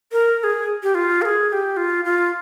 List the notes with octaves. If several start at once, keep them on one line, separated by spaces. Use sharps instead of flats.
A#4
A#4
G#4
G4
F4
A#4
G#4
G#4
G4
F4
F4